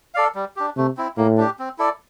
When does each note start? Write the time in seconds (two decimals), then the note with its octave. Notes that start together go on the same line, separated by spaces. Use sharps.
0.14 A4 D5 F5
0.35 G3
0.56 D4 G4
0.77 C3 A3
0.97 C4 E4
1.17 A2 A#3
1.37 D4 G4
1.59 C4
1.78 E4 A4 D5